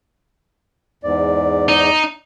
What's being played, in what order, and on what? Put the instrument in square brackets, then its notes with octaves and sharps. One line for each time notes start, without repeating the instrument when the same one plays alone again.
[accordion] E2 G#2 D5
[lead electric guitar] D#4